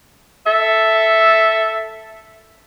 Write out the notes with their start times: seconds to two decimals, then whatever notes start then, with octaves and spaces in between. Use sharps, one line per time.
0.46 A4 E5